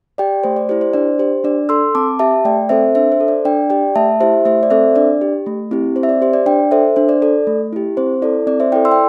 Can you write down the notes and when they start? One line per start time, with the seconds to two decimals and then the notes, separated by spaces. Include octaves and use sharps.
0.18 G4 D5 G5
0.44 A3 C5
0.56 D5
0.69 E4 G4 C5
0.81 C5
0.94 D4 D5
1.19 G4 C5
1.44 D4 D5
1.69 A4 C6 E6
1.95 C4 A5 D6
2.19 G4 E5 A5
2.45 A3 D5 G5
2.69 C4 A4 C5 E5
2.95 D4 C5 E5
3.12 C5
3.20 A4
3.28 D5
3.45 D4 D5 G5
3.70 G4 D5 G5
3.95 A3 E5 A5
4.20 E4 G4 C5 E5
4.45 A3 C5 E5
4.63 D5
4.70 C4 A4 C5 E5
4.96 D4 D5
5.21 G4
5.46 A3
5.71 C4 E4 G4
5.96 C4 C5
6.03 E5
6.09 D5
6.22 G4 C5
6.33 D5
6.46 D4 D5 G5
6.71 A4 C5 E5
6.96 D4 C5
7.09 D5
7.22 A4 D5
7.47 A3
7.73 E4 G4
7.97 C4 C5
8.22 E4 A4 D5
8.47 C4 D5
8.60 C5 E5
8.72 E4 A4 D5 G5
8.85 C6 E6
8.92 G5